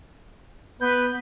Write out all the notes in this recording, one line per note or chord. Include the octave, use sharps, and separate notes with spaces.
B3 B4 G6